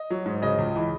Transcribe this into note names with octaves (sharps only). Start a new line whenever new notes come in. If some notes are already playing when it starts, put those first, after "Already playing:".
Already playing: D#5
F#3
G#2
C#3 D#5
C#2
E3